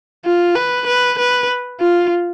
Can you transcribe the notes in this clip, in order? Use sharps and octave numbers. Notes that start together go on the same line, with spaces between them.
F4
B4
B4
B4
F4